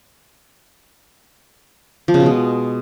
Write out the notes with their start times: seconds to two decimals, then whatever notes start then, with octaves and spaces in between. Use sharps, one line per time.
2.08 F3
2.14 C#3
2.20 B2
2.26 G#3